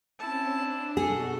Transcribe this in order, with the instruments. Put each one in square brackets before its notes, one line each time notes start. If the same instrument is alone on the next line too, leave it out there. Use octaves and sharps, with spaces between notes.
[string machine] C4 C#4 [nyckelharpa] E4 A5
[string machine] D4
[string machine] B2 F#4 [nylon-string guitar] G#4 [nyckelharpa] A4